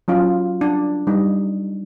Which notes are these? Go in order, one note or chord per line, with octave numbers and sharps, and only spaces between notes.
F#3 C#4 F4
D4
G3 D#4